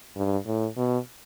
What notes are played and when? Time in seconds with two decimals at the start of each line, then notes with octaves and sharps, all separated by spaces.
0.16 G2
0.46 A2
0.77 B2